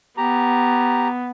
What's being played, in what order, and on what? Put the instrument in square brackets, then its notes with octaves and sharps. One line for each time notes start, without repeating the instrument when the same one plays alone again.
[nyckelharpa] B3 [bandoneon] G4 A#5